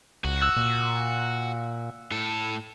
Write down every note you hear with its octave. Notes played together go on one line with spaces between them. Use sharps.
C#2 F#4
E6 F#6
A#2
A2 A4